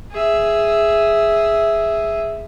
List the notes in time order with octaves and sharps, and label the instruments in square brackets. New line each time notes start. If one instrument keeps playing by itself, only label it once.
[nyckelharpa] G#4 E5